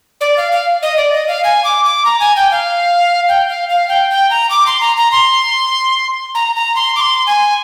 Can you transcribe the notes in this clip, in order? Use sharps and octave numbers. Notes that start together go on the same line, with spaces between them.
D5
F5
F5
D#5
D5
D#5
F5
G#5
D6
D6
A#5
G#5
G5
F5
G5
F5
F5
G5
G5
A#5
D6
C6
A#5
A#5
C6
A#5
A#5
C6
D6
C6
G#5